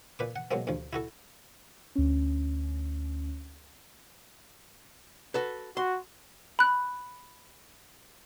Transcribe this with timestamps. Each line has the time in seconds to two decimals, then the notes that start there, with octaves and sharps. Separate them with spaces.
0.19 A#2 B4 D6
0.36 F#5
0.51 B2 F#3 G#3 A#3 C4
0.67 D2 G2 F3
0.93 E4 F#4 A4
1.95 D2 C#4
5.34 F#4 A4 B4
5.77 F#4 C6
6.59 B5 F#6